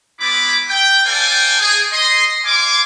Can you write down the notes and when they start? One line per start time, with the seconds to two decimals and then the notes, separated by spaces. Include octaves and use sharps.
0.20 G#3 B3 E4 B5 D6
0.68 G5
1.05 A4 C5 D5 F5 G5 G#5
1.60 G#4
1.92 D#5 C6
2.46 F5 G#5 C6 D6